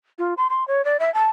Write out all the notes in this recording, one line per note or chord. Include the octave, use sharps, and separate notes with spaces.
F4
C6
C6
C#5
D5
E5
A5